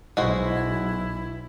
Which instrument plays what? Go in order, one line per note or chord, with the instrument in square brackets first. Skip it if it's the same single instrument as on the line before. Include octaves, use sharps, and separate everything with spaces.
[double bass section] B1 [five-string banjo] G#3 F#4 C5 [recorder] E4